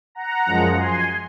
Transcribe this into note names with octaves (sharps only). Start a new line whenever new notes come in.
F#5 A#5
F#2 F3 G#3
G#5 C6